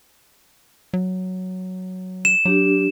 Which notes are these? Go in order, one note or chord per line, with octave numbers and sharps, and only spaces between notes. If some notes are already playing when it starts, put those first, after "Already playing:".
F#3
E7
F#3 D4 G4